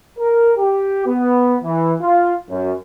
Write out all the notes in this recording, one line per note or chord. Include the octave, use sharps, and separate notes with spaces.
A#4
G4
B3
E3
F4
F#2